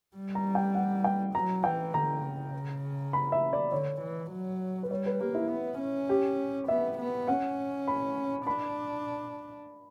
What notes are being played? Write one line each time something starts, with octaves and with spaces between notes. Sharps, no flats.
G3
A#5
G5
F#5
G5
F#3 A#5
E3 G5
D3 A#5
C#3
B5
E5
D5
D3 C#5
E3
F#3
B4
G3 C#5
B4
A#3 G4
E4
B3
C#4
G4
B3 E5
B3
C#4 F#5
B5
D4 B5